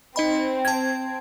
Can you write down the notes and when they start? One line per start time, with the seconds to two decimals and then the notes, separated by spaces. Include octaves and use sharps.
0.16 C4 D#4 D#5 B5
0.65 A5 G#6